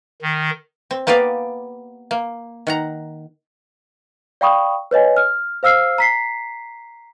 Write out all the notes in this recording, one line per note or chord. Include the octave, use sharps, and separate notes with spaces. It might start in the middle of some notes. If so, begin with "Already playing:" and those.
D#3
C4
A#3 B3 G4 D5 F5
A#3
D#3 F#5 A#5
D5 F5 G5 B5 C#6 D#6
B4 C#5 D#5 G#5
F6
C5 F5 E6 F6 C7
A#5 B6 C7